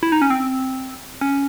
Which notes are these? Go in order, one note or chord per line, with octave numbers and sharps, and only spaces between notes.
E4
D#4
C#4
C4
C#4